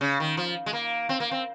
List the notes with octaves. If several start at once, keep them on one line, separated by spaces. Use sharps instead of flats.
C#3
D#3
F3
G#3
A#3
C4
A#3
C4